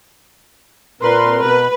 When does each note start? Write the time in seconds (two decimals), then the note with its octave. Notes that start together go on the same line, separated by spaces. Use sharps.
1.02 A#2 C4 A#4 B4 C6
1.42 B2 B4